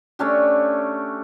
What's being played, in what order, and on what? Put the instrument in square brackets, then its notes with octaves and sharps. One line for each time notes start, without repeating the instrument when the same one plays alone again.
[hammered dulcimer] A3 C#4 D4 G4